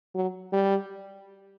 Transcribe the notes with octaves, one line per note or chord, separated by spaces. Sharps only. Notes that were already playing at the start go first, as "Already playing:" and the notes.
F#3
G3